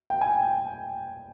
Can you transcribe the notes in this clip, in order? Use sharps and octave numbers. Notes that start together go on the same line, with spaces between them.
G5
G#5